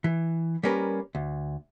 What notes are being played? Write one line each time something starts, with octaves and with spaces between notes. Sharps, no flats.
E3
G3 A#3 C#4 A#4 B4
D2